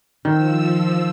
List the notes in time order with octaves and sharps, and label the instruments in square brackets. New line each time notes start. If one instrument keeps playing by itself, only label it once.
[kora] D#3 [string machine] F3 E6